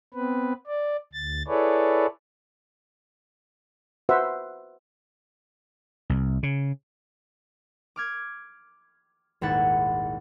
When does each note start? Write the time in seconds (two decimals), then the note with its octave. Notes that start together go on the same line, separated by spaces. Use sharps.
0.14 B3 C4 B4
0.67 D5
1.13 D2 A6
1.48 E4 G#4 A4 B4 C#5 D5
4.09 F#4 B4 C5 E5 F#5
6.10 C2
6.43 C#3
7.96 D6 F6 G#6
9.41 D#1 G#1 E4 F#5 A6